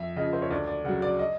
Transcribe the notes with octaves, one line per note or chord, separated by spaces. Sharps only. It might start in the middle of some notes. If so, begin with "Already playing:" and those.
Already playing: F2 E5
C#3 F3 D#5
C5
C#5
D2 D5
D5
C#3 F#3 F#5
D5
D#5